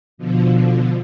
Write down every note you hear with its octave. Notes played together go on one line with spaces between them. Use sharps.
B2 D3 F3